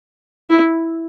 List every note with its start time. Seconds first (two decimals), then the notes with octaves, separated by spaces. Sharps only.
0.50 E4